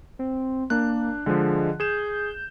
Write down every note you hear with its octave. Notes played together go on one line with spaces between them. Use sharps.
C4
A#3 D4 F#6
D3 F3 G#3
G#4 G6 E7